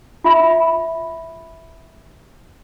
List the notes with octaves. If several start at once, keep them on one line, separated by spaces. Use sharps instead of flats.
F4 E5 B5